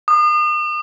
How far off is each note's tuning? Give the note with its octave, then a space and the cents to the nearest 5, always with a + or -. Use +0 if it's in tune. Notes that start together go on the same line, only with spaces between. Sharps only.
D#6 -40